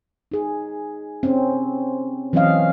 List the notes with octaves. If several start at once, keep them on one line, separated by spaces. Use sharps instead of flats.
D#4 G#4
C4 C#4
E3 F#3 C4 C#4 D#5 F5